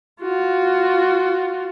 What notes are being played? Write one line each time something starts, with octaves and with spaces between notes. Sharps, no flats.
F4 F#4